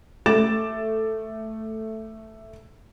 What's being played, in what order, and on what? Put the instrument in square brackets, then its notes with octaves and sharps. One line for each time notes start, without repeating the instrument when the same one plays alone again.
[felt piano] A3 D6 A6 E7